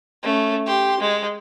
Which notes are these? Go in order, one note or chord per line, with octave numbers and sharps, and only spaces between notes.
A3 C#4
G4 C6
G#3